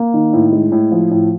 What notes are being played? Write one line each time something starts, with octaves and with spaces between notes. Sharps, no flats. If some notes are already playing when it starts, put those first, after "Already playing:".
Already playing: A#3
D#3
A2
G#3
A2
F3
A2